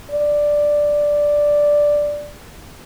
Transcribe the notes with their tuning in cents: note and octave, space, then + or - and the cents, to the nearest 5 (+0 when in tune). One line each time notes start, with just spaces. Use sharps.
D5 +0